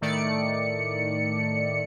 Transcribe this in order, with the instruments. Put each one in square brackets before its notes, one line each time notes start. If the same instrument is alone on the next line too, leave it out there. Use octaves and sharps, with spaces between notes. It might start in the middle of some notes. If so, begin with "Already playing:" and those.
[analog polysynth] A2 D#3 A3 D5 C#7